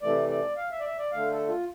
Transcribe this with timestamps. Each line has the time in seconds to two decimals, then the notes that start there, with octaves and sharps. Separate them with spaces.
0.02 C3 E3 A3 D5
0.29 D5
0.57 F5
0.71 E5
0.80 D5
0.85 E5
0.99 D5
1.12 D3 A3 F5
1.31 A4
1.48 F4